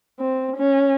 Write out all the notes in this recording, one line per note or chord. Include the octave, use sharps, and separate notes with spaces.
C4
C#4